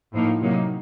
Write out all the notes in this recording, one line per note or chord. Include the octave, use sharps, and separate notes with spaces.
A2 F3 A#3 D#4
C3 F#3 A#3 D#4